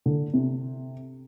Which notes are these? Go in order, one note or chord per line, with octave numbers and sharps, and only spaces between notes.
D3
C3